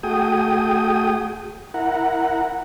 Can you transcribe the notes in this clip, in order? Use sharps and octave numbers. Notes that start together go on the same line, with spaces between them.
A3 F#4 G#4 G5 D#6
E4 A#4 F#5